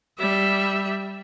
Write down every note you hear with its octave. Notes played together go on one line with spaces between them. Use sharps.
G3 E5